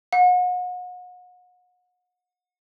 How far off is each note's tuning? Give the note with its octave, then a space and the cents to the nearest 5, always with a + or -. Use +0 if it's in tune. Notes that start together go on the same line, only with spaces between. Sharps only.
F#5 -35